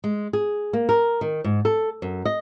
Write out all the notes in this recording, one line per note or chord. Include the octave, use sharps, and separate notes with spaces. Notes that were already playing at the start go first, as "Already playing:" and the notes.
G#3
G#4
A#3
A#4
D#3
G#2
A4
F#2
D#5